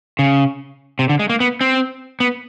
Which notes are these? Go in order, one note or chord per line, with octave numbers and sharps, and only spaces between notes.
C#3
C3
D3
G#3
A#3
B3
C4
B3